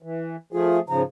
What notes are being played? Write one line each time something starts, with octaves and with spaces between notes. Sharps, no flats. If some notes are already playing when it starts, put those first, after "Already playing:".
E3
F3 A3 F4 G#4
G#2 C#3 F3 A#5